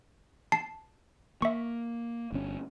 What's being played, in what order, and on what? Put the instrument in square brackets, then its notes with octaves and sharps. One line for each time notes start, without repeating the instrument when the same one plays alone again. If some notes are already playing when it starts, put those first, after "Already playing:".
[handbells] A5 C7
[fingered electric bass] A#3 [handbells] E5 C#6
[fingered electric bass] G1 C#4